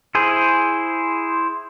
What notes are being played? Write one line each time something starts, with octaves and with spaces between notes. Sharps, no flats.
E4 G#4 C5